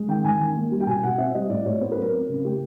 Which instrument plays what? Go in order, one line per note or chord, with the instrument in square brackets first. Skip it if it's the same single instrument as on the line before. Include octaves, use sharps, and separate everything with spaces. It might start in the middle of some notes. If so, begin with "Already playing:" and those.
Already playing: [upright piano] G#3
D#3 G5
D#3 G#5
D#3
A#3
G3
G5
B2 G#5
B2 F#5
C4 E5
G3 D#5
A2 D5
A2 C#5
B3 C5
B4
F#3 A#4
C4
C#3
A3 G4